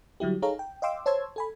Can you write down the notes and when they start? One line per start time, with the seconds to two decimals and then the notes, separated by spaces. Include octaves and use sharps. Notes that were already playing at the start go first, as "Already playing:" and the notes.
0.20 D3 F#3 G3 E4 G4
0.42 D#4 G#4 A4 C#5 F5 A#5
0.59 G5
0.82 D#5 F5 G5 C6 D6 E6
1.06 C5 C#5 A5 C6 E6 G#6
1.36 A4 G#5 B5